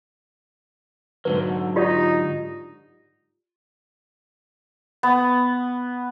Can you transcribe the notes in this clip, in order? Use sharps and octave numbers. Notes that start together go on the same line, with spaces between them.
G#2 D3 F#3 B4
D#4 F4 G4 D5
B3